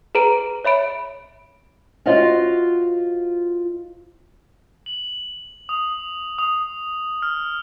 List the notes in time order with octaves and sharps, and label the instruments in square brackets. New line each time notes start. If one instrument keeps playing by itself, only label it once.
[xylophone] G#4 B4 A#5 D7
C#5 E5 B5 D7
[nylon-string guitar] F4 F#4 C5 D#5 F5 F#5
[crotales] F#7
D#6
D#6
F6